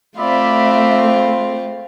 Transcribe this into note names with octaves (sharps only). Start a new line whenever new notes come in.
A3 C4 F4 D5 E5 B5